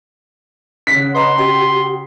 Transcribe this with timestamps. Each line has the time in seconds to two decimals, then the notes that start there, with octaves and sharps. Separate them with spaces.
0.87 C#3 C#4 F#5 B6
1.15 B4 D#5 A#5 C6
1.38 F#4 G4 G5